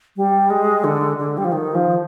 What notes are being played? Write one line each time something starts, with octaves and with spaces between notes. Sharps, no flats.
G3
G#3
D3
D3
G3
F3
D#3
F3